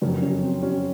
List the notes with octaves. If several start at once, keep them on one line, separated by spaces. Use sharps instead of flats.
F#1 F2 C#3 F#3 C#4
C#4
C4
C#4